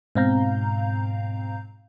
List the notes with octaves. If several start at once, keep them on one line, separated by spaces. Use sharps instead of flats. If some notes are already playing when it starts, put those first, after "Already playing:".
G#2 B2 C4 F5 A#5 G6